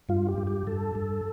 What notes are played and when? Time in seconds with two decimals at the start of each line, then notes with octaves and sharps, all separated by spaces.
0.09 G2 F4
0.28 G4
0.38 G2
0.47 G4
0.67 G2 A4
0.95 G2